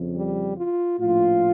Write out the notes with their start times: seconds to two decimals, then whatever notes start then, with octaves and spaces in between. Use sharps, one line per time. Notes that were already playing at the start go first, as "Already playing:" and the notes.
Already playing: F2 C#3 F3
0.14 G3
0.56 F4
0.98 A#1 A2 F3 F4